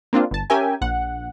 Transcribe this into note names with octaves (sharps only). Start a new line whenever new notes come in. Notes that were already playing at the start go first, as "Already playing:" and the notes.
A#3 C4 D4 F4
G1 A5
C#4 G4 A#4 E5 G5 G#5
A#1 F#5